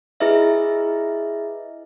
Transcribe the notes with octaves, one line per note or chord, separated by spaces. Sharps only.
E4 G#4 B4 D#5 E5